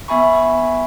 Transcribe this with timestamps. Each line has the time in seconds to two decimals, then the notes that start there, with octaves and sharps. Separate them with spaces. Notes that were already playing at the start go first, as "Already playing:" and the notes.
0.08 B3 E5 G#5 B5 C#6